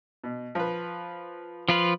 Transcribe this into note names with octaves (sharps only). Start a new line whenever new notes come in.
B2
F3 B4
F3 F4 B4